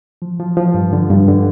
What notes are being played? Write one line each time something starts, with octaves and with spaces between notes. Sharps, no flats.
F3
F3
F3
G2
D3
G2
D3